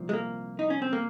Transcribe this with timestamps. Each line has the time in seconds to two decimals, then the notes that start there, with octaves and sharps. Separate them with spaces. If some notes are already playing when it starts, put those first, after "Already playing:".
Already playing: C2 A#2 F3
0.09 G#3
0.13 A#3
0.59 D#4
0.70 C#4
0.82 C4
0.93 A#3